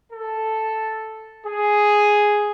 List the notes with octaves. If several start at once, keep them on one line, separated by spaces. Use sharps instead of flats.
A4
G#4